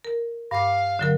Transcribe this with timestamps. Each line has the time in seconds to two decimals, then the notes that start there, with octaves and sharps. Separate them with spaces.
0.05 A#4
0.51 G2 F5 D6
0.99 D3 F#3 A#4